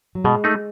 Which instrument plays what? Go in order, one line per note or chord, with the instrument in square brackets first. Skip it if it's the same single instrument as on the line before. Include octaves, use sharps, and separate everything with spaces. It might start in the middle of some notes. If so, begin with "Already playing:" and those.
[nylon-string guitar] F#3
[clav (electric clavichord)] B2 [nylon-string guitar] G#3
[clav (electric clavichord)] A3 D#4